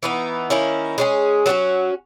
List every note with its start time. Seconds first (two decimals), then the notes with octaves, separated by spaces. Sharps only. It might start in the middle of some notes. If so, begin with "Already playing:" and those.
0.03 E3 B3 D#4
0.50 D#3 A#3 C#4 E4
0.98 G#3 C#4 G#4
1.46 F#3 A#3 C#4 F#4